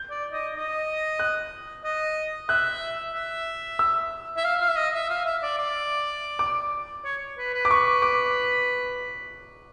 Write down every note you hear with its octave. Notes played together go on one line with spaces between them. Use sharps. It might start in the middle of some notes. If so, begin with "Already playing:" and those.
Already playing: G6
D5
D#5
D#5
F#6
D#5
E5 F#6
E5
E6
E5
F5
F5
E5
D#5
E5
F5
E5
D5
D5
D6
C#5
B4
B4
D6
B4 C#6
D6